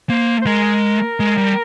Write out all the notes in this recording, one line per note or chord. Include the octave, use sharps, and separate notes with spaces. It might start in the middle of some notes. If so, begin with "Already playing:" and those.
A#3 C5
C5
G#3 A#4
G#3
G3